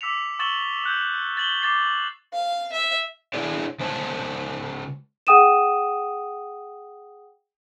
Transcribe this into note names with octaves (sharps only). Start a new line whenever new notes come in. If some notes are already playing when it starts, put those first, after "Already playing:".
D6 E6 B6 C#7 F7
C#6 E6 A6 E7 F#7 G7
E6 F#6 G6
A6 F#7 G7
D6 A6 C7
F5
E5
D4 E4 G#4 C#5 D5
C#3 G#3 C5 C#5 A5
G#4 F#5 G5 D#6 D#7 E7